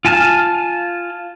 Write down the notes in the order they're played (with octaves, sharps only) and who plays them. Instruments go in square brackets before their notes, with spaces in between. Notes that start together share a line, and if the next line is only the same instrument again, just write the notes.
[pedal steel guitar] F4 G#5 A5 F6